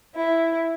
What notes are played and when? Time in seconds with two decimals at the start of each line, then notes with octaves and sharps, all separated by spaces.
0.16 E4